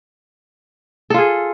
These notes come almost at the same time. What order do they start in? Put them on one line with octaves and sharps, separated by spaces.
A4 F4 G#4